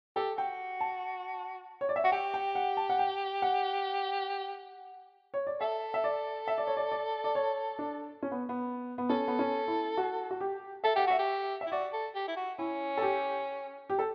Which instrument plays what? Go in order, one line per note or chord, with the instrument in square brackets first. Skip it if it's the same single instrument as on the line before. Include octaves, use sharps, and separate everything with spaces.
[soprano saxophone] G4 [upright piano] A4
[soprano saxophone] F#4 [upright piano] G5
[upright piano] A5
C#5
D5
E5
[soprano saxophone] F#4 [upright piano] F#5
[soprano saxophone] G4 [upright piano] G5
[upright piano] G5
F#5
A5
F#5
G5
F#5
C#5
D5
[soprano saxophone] A4 [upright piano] E5
[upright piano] E5
D5
E5
D5
C#5
D5
D5
D5
C#5
D4
C#4
B3
B3
B3
[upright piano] C#4 [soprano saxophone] A4
[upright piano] B3
C#4
E4
F#4
F#4
G4
[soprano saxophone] A4 [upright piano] E5
[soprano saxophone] G4 [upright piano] F#5
[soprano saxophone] F#4 [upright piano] E5
[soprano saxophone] G4
[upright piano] E5
[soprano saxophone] E4
[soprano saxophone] F#4 [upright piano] D5
[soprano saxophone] A4
G4
E4
F#4
[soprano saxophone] C#4 [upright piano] E4
[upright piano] A4
G4
G4
A4